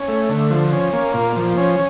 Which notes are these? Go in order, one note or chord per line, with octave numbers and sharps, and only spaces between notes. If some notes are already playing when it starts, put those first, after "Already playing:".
Already playing: C#4
A3
D3
F3
C#4
A#3
A#2
F3
C#4